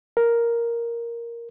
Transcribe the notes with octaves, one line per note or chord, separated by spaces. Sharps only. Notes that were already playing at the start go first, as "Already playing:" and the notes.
A#4